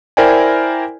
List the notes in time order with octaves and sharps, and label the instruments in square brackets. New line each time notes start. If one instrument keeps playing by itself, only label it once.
[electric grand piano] E4 A#4 C5 D5 G5 G#5